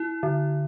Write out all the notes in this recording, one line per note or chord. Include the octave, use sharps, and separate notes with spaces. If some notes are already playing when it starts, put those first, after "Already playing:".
Already playing: E4
D3